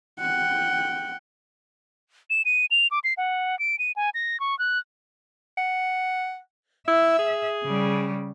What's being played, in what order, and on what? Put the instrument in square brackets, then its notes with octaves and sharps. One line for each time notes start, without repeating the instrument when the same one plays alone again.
[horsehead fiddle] F#5 G5
[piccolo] E7
D#7
F7
D6
C7
F#5
D7
D#7
G#5
A#6
C#6
F#6
[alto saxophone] F#5
[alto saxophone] E4 [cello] E5
[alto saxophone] G#4
[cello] C#3 G3